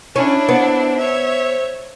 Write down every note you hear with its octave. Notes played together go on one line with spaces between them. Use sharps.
C#4 D4 E4
B3 C5
C#5 E5